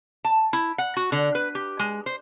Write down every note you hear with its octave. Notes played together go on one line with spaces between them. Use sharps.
A5
E4
F#5
F#4
D3
B4
G4
G#3
C5